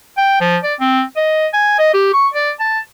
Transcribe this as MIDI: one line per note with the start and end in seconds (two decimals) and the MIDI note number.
0.17 0.40 79
0.41 0.57 53
0.63 0.74 74
0.80 1.02 60
1.16 1.47 75
1.53 1.74 80
1.79 1.90 75
1.94 2.11 67
2.14 2.28 85
2.34 2.51 74
2.60 2.79 81